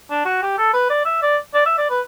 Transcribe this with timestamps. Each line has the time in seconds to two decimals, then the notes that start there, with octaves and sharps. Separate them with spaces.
0.10 D4
0.25 F#4
0.42 G4
0.58 A4
0.73 B4
0.90 D5
1.05 E5
1.22 D5
1.54 D5
1.66 E5
1.78 D5
1.90 B4